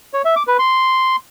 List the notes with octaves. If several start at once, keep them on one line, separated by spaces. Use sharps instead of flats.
C#5
E5
D6
B4
C6